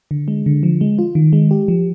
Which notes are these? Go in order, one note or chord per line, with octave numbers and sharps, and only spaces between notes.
D3
G#3
D3
F3
G#3
F4
D#3
G#3
G4
F3